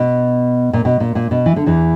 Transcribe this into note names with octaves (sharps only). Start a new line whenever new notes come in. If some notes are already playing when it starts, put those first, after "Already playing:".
Already playing: B2
A#2
B2
A#2
A#2
B2
E3
D3
E2 E3